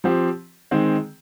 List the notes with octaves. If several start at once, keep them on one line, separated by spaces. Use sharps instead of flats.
F3 C4 G4
D#3 G#3 C4